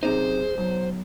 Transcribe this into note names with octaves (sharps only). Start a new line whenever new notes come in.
F#2 C3 D#4 G#4 C5
B1 F#3